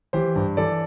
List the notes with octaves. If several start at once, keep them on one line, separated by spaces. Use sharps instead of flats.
E3 G4 C5
G2
E3 A4 D5